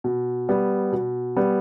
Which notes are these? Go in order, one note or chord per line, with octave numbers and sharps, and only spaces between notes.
B2
G3 B3
B2
G3 B3